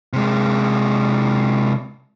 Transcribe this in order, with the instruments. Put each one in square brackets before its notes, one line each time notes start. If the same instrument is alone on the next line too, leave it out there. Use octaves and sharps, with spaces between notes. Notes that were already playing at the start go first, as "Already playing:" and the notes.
[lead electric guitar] C3 G#3